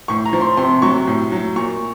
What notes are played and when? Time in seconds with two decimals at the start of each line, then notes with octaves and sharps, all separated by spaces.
0.08 A2 C#6
0.25 A#5
0.33 F3
0.41 C6
0.57 C3 C6
0.82 F#3 C#6
1.07 A2
1.32 F#3
1.56 A#2 C#6